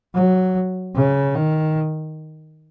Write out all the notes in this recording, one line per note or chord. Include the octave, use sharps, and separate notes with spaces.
F#3
C#3
D#3